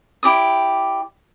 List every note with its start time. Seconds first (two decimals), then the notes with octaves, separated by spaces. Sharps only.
0.23 E4 G4 D5 D#6